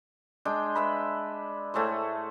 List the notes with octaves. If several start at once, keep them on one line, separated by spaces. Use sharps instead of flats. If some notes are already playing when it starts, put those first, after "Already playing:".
G#3 D4 G5
B4 E5 B5
A2 A3 G#4 C5